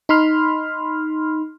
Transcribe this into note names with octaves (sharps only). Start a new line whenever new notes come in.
D#4 B5 C6 F6